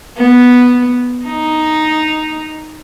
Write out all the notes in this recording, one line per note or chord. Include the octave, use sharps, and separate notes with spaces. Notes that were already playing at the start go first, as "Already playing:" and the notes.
B3
D#4